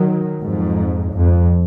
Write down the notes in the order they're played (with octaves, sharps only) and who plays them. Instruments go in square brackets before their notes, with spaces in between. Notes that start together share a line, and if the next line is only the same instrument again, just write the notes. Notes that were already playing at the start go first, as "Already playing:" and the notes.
Already playing: [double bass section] D#3 F#3
F2 G#2
F2